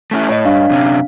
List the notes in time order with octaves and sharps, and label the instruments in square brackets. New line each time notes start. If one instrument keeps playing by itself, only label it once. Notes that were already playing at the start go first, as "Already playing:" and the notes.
[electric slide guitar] A3 C#4 E4
[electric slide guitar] A2 [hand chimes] C#5 D#5
[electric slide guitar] G2 [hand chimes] D4 F5
[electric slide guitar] F#2 C3 C#4